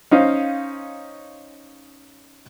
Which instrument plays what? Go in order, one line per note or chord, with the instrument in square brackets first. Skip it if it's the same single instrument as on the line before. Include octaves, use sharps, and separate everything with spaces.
[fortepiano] C#4 D#4 C5 F5